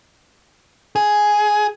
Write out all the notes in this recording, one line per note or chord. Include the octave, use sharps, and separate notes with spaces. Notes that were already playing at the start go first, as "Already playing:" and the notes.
G#4